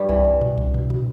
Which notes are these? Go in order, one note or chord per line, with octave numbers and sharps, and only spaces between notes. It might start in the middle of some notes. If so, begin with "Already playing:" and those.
Already playing: G2 G3
C2 E3
C2
B2
C2
B2
B2